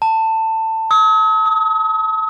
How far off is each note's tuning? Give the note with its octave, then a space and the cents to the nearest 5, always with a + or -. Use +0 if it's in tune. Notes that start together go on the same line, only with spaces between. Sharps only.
A5 +20
D#6 +45
D#6 +15